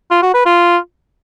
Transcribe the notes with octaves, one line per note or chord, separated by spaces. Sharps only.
F4
F#4
B4
F4